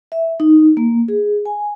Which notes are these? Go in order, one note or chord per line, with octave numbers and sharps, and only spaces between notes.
E5
D#4
A#3
G#4
G#5